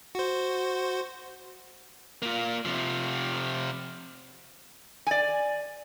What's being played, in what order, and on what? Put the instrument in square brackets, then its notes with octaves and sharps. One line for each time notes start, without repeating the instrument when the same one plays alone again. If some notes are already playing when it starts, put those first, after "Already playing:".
[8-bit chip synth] F#4 C5
[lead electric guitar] A#3 F4
C3 F3
[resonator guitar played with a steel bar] D5 G#5